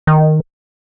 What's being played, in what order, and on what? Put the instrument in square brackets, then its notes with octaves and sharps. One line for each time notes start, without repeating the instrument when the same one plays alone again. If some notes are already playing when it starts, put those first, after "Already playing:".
[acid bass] D#3